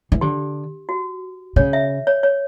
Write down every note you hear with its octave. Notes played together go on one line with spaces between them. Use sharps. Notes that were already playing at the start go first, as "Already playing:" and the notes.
E3
D3 G4
F#4
C#3 C#5
E5
C#5
C#5